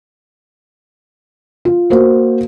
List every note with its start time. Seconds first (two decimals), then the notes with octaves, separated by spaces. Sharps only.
1.65 F4
1.90 A#3 F#4 C5